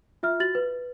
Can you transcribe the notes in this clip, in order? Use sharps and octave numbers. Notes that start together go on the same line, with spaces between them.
F4 E5 F6
F#4 A6 F#7
B4